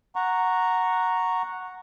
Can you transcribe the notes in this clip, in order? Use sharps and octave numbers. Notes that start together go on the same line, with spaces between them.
F#5 A#5 C#6